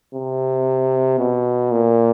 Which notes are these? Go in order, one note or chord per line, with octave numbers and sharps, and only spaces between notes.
C3
B2
A#2